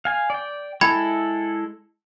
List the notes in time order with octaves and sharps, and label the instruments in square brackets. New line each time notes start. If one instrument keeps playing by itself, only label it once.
[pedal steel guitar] F5 G#5
D5 G5
[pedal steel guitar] G#3 E4 A4 [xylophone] G5 B5 G#6